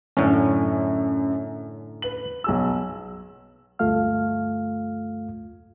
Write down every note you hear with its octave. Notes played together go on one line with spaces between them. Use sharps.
F#2 A2 D3 C#4
B4 F#7
B1 G#4 E6
D2 G2 A3 F4 F5 F6